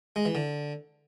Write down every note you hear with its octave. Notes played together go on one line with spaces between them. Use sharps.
G#3
E3
D3